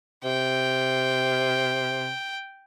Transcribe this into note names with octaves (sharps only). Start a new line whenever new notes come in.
C3 G5